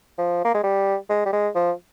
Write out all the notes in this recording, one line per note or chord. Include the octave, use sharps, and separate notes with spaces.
F3
A#3
G#3
G3
G#3
G3
G#3
F3